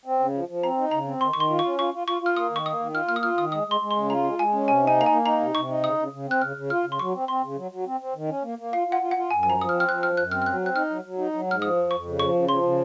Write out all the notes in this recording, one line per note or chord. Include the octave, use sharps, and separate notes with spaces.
C4
C#3
F3
F3
C4 A#5
D#4
C#3 A#5
C4
D#3 C6
D#3 C#6
C6
F4
C#6
C#4
F4 C#6
F4
F4 C#6
F4 F6
A#3 D#6
D#3 C#6
A#3 D#6
D#3
F4 F6
A#3 F6
D#6
F4 F6
D#3 D#6
G#3 D#6
G#3 C6
G#3
C6
C#3
F4 A#5
G#3
G#3 G#5
C#4
C3 G#5
D#4 G#5
A#3 A#5
G#5
A#3
D#4 A#5
C3
C3 C#6
D#4
C#3 D#6
C#3
C#3
C4 F#6
C#3 F6
C#3
F4 F6
C#3
C6
F#3 C#6
C4
C4 C6
C#3
F#3
F#3
C4
C4
D#3
C#4
A#3
A#3
F4 F5
F4 F#5
F4
F#5
F4
F#2 G#5
F3 G#5
A#5
F3 D#6
F6
C4
F6
F3 F#6
F#2 F6
F#2 F#6
C4 F6
F6
F#3 F#6
C4
F#6
D#4 F6
F#3
F#3
D#4
F#3
G#2 F6
F3 D#6
F2
F2 C#6
C#3
F3 C#6
C#3
F3 C6
C#3